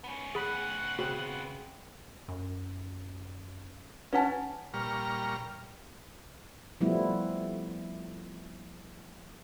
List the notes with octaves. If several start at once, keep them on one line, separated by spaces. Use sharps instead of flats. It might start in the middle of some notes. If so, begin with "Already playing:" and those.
B3 C#4
G#4 F#5 B5 B6
C#3 C4 F#4
F#2
C#4 B4 F#5 G#5 A5
A#2 G3 A#5 C#6 F6
F3 G3 A3 B3 E4